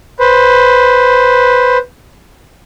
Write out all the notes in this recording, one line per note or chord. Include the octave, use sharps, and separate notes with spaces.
B4 C5